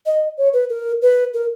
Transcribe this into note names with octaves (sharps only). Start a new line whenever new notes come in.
D#5
C#5
B4
A#4
B4
A#4